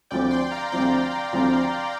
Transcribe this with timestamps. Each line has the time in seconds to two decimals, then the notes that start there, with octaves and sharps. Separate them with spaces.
0.11 D2 C3 F3 C4 D5 G5
0.31 G5 C6
0.51 F5 A#5
0.72 D2 C3 F3 C4 D5 G5
1.32 D2 C3 F3 C4